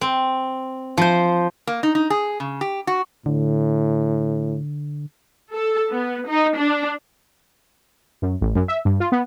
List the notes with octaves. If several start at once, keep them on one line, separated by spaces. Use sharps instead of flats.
C4
F3 C5
A#3
D#4
D#4
G#4
C#3
G4
F#4
A2 D3
A4
B3
D#4
D4
F#2
A1
F#2
E5
G2
F4
B3